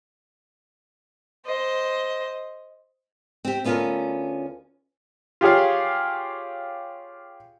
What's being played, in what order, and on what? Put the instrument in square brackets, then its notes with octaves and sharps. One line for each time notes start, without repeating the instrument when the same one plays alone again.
[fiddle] C5 D#5
[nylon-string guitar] C4 G4
D2 B3 C#4 F4 A4 A#4
[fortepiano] F4 G4 G#4 C#5 F5